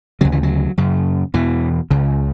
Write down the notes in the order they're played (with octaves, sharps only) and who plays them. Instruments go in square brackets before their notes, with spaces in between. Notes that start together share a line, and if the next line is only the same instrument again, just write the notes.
[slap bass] D2 C#3 F#3
E3
F#3
F#2 C#3
E2 B2 E3
C#2 C#3